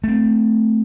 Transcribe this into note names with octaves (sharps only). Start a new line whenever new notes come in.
A3 C4